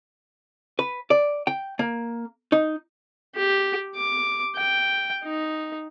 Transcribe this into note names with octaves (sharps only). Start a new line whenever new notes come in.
B4
D5
G5
A#3
D#4
G4
D6
G5
D#4